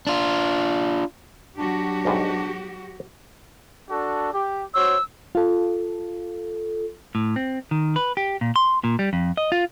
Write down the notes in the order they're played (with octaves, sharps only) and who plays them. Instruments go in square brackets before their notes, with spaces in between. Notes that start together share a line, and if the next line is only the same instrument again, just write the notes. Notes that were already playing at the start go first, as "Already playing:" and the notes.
[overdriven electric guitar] D4 F4
[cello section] F#3 F#4 G4 [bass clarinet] D4
[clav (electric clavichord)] B1 G#2 G3
[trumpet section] D4 F#4 A4
G4
[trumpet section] F#4 C5 C#5 [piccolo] E6
[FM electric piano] F4 A4
[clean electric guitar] A2
C4
D#3
B4
G4
A#2
C6
A#2
G3
F2
D#5
F4